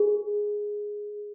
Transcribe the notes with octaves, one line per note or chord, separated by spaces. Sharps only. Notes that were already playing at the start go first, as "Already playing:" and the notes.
Already playing: G#4